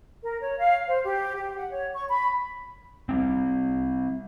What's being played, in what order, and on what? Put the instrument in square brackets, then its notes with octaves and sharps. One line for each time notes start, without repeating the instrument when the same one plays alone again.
[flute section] A#4
C#5
F5
C5
G4
G4
F#5
C#5
C#6
B5
[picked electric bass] G3 A3 C4